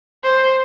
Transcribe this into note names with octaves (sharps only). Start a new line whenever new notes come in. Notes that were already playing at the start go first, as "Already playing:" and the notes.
C5